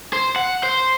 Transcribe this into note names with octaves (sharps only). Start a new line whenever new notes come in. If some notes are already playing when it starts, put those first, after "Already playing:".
C5
F#5
C5